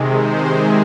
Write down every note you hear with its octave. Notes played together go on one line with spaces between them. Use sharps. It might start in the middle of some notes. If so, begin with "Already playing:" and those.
Already playing: C3 D#3 G#3
C5
G#4